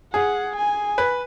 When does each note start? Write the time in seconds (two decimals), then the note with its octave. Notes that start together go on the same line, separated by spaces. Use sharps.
0.14 G#4 F#5
0.56 G#5
0.98 B4